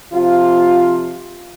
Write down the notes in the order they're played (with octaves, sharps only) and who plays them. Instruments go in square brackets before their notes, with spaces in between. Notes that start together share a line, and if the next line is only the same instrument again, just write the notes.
[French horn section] C3 F3 F4